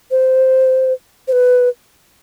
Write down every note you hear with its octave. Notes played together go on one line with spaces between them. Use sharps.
C5
C5
B4